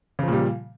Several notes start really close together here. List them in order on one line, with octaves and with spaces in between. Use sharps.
C#3 F3 A#2 G3